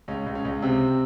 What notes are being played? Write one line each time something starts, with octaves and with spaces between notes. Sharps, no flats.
C#2 C#4
C#2
C#4
C#2
C3 C4